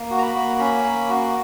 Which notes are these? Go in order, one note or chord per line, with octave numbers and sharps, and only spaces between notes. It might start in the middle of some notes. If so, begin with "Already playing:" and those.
Already playing: A#3
F#4
A#5
B5
A#3
C#4 B5
A#3
F#4